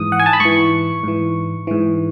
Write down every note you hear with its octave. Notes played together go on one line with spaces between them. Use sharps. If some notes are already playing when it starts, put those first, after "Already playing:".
Already playing: G#2 E3 D#6
F#5
G#5
A5
B5
G#2 E3 C#6
G#2 E3
G#2 E3